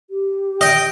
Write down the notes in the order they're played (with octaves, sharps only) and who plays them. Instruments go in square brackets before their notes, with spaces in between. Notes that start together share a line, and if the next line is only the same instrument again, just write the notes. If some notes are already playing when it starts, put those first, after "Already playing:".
[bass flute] G4
[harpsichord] D#5 [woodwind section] G5